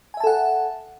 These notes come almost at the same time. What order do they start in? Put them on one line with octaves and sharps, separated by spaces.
G#5 E5 A5 A4 F#5